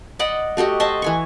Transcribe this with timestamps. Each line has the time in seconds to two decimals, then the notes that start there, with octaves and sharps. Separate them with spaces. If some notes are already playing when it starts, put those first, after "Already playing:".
0.19 D5 D#5 F#5 B5
0.57 A3 F#4 G4 D#5
0.80 C5 D#5 E5 A5
1.02 E3 G#5 C#6